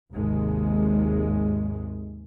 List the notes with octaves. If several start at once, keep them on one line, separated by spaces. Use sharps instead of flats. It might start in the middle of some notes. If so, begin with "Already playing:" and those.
G#1 D#2 C3 G#3